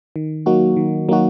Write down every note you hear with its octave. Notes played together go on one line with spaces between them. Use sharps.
D#3
F#3 A#3 D#4 F#4
D#3
F#3 A#3 D#4 F#4